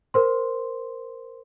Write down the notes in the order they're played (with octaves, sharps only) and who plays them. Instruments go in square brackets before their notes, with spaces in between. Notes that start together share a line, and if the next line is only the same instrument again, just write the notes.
[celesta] A#4 C5 C6